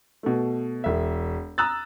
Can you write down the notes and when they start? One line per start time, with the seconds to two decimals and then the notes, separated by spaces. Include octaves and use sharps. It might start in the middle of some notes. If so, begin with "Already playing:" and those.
0.23 B2 A3
0.84 E1 E5
1.58 A#5 D#6 E6 F#6 A6